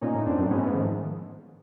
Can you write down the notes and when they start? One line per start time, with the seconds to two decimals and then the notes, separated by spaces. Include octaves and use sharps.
0.01 A#2 C#4 D#4
0.14 A2
0.26 F2 C4 D4
0.39 F#2
0.50 G#2 B3 C#4
0.63 A3 B3
0.75 D#3 F3